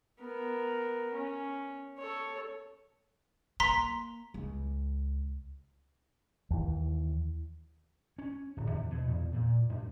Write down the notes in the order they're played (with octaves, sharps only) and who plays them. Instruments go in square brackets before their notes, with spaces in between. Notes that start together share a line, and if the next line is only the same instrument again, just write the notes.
[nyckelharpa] B3 A#4
C#4
A4 C#5
[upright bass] A#3 [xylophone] A#5 C6 B6
[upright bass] C#2
[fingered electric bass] D#2 E3
[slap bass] C#4
D1
D#2
B2
E2
A#2
F#2